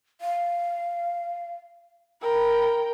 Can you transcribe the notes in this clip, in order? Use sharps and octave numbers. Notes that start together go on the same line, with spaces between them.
F5
A#4 G5 B5